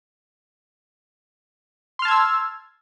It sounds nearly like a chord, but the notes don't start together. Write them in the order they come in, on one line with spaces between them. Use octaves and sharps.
C6 F6 A5 G#6 E6